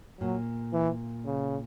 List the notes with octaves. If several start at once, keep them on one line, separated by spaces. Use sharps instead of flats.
A#2 F#3
E3
C#3